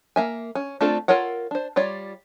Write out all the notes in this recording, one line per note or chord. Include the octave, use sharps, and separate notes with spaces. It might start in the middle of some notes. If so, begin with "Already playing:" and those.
A#3 E5 G#5
C#4
A3 C4 D4 F4 A4
F4 A4 A#4 C#5 F#5
D4 C5
G3 F4 C#5 D5